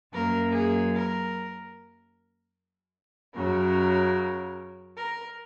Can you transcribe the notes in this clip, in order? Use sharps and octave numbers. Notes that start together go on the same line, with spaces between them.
F#2 F#3 A#3 A#4
G#4
A#4
F#2 C#3 F#3 A#4
A#4